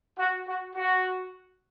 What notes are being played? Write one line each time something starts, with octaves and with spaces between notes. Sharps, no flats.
F#4
F#4
F#4